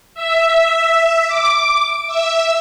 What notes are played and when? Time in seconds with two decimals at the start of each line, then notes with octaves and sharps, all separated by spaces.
0.14 E5
1.28 D6
2.07 E5